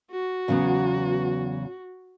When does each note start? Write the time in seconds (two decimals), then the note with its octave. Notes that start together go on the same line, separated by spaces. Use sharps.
0.11 F#4
0.48 E2 C#3 F#3 B3